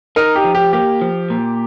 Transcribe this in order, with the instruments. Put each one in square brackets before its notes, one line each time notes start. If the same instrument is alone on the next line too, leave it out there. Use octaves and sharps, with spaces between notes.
[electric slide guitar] D#4 [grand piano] A#4
[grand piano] G4
[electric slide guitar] F3
[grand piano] G4
[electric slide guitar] A#3 [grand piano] G4
[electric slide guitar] F3
A#2